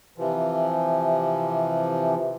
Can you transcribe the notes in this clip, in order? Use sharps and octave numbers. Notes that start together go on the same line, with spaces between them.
C3 E3 F3